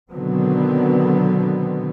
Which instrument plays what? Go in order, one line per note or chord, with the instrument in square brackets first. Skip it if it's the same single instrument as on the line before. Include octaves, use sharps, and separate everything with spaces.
[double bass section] B2 D3 D#3 F#3 B3 C4